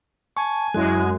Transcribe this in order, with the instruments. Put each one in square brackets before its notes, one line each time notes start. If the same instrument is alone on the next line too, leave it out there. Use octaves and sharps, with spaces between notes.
[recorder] G#5 [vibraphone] A5 [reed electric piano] C#6
[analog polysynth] F#2 G#3 [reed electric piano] F#3 E4 [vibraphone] F#4